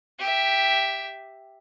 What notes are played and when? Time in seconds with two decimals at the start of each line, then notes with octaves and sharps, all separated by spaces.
0.19 G4 E5